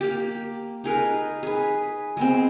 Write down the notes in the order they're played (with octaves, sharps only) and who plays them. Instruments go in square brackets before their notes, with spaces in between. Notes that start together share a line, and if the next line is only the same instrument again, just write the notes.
[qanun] A#3 G4
D#4 G#4 A#4 B4
G#4 B4
G#3 B3 C4